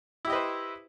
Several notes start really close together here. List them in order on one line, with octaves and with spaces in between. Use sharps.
E4 G4 D#5 B4 C5